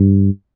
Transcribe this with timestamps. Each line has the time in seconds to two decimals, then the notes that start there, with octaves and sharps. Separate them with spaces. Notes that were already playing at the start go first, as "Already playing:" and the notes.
Already playing: G2